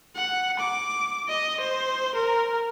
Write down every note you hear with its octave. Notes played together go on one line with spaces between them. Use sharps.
F#5
D6
D#5
C5
A#4